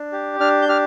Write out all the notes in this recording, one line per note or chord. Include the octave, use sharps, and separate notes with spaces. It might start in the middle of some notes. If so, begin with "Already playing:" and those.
Already playing: D4
G4
D4 F6
G6
G4 F6